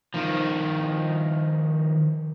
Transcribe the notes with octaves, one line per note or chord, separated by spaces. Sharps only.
D#3 F3